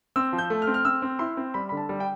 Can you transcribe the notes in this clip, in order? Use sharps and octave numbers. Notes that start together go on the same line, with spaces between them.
C4 E6
F3
G6
A3
F6
C4
F6
C4 E6
C4
E4 C6
C4
G3 B5
D3 B5
A5
G3
G5